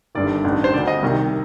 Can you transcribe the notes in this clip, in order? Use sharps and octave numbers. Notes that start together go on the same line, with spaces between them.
G1 G2 D#3 D5
A1 G2 D#3
C5
D2 D3 D5
D#5
C2 C3 D#3